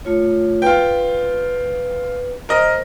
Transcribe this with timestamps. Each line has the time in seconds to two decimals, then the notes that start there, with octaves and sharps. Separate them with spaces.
0.05 A3 F4 C#5
0.62 F4 B4 G5
2.49 A#4 C5 D#5